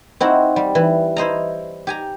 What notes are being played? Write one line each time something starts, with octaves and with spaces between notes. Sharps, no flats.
C4 D#4 E4 F#4
G3
E3
E4 C5 D#5 A#5
G4 G#5 A#5